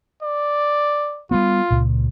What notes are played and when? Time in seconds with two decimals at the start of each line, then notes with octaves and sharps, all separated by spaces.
0.22 D5
1.31 G3 G#3 B3 F4
1.71 C#2 A#2